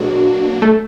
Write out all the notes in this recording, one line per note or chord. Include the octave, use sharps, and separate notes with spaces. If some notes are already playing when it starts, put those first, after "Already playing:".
Already playing: B2 F#3 G#3 A#3 D4 F#4
A3